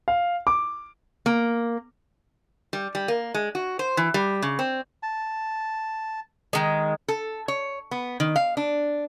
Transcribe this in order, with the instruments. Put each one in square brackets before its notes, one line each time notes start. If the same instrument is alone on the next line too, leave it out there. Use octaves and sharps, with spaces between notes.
[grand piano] F5
D6
[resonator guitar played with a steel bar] A#3
G3
G3
A#3
G#3
F#4
C5
E3
G3
C#3
C4
[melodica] A5
[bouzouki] D#3 G#3
[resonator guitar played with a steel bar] A4
C#5
B3
D#3
F5
D4